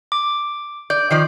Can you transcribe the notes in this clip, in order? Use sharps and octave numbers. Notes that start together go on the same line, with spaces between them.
D6
D5 G6
D#3 F3 D5